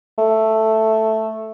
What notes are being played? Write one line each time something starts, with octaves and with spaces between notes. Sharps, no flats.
A3